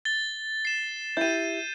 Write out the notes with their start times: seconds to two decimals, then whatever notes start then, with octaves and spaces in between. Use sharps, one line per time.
0.05 A6 G7
0.65 C7 E7
1.17 E4 G4 G6 D#7